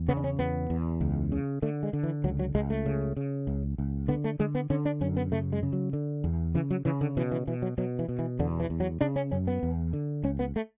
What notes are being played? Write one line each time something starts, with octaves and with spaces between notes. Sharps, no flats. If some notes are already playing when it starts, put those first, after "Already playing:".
Already playing: E2
C#3 B3
D4
C#4
E2 B3
E2
C#2
C#3
D3 A3
G#3
D3
E3
C#2 F#3
F#3
C#2 G#3
A3
C#3
C#3
C#2
C#2
D3 B3
A3
D3 G#3
B3
D3 C#4
D4
F#2 C#4
B3
C#3 A3
G#3
C#3
F#3
D3
E2
C#3 E3
F#3
C#3 E3
D3
B2 E3
E3
B2 E3
F#3
B2 F#3
E3
B2
E3
E2 D3
E3
E2
F#3
C#3 D4
C#4
F#2 C#4
B3
E2
D3
C#2 C#4
B3
A3